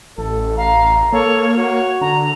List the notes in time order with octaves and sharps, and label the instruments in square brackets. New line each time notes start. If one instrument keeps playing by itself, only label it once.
[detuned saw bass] A1 [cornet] A4
[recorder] F5 [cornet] A#5
[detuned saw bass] A#3 [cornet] A4 [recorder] C#5
[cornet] F#4 [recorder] C#5
[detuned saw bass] D3 [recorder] A#5